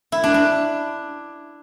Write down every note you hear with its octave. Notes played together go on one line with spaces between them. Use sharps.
E4
D4
D4